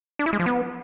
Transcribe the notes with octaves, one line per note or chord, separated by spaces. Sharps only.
D4
E4
G#3
F3
B3